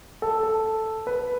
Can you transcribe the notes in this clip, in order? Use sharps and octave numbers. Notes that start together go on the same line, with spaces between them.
A4
A4
B4